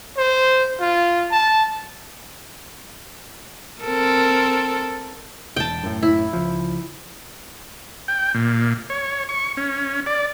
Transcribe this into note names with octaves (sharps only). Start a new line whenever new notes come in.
C5
F4
A5
C4 A4 A#4
E1 G5 A5
F#2 A2
E4
C#2 F3
G5
A#2
C#5
C#6
C#4
D5